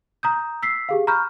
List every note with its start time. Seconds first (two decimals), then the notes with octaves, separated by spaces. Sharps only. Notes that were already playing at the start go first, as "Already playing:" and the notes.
0.23 A#5 D#6 G6
0.62 E6 B6 C7
0.89 G4 G#4 F5
1.07 A#5 B5 C#6 F6 G6